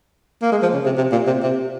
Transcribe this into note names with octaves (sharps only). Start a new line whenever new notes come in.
A#3
G#3
F3
C#3
C3
C3
A#2
C3
C3